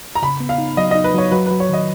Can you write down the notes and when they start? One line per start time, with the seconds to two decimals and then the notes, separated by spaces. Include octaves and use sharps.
0.15 A#5
0.22 C#3 B5
0.40 B3
0.49 F5
0.58 D#4
0.77 F#3 D#5
0.91 D#4 D#5
1.04 B4
1.14 F#3 C#5
1.31 F#3 B4
1.46 F#3 B4
1.60 C#5
1.69 D#3 D#5